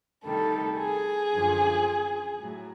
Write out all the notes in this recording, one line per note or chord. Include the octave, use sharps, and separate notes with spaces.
D2 C3 D#3 G3 A4
G#4
F#2 D3 F3
A2 F#3